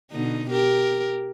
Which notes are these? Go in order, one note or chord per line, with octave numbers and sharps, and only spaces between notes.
B2 D3 D#4
G4 A#4